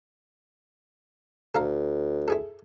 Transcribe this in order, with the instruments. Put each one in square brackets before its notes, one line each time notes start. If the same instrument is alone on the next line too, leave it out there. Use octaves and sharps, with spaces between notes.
[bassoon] D2 [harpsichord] A4 F5 A#5
[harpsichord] E4 G#4 A4